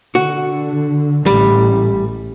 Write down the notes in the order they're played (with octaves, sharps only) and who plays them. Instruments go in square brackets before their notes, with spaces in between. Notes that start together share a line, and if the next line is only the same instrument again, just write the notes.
[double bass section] D3 [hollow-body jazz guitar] F#4
[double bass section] A1 [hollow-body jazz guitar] G3